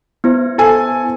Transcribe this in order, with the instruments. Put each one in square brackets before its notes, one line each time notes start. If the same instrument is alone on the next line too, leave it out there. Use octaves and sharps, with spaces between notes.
[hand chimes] B3 E4 C5
[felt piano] A4 G#5